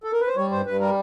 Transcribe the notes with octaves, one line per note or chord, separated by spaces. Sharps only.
A4
A#4
B4
C5
G3 C#5
G2 C5
G2 B4
G3 A#4